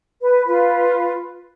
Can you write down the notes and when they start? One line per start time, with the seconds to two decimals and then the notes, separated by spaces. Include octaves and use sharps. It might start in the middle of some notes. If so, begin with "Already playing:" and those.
0.20 B4
0.45 F4 B4